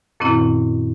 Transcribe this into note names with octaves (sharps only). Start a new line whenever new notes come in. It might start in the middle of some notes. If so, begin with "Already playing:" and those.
F#2 A#2 D#3 C4 C#4 E4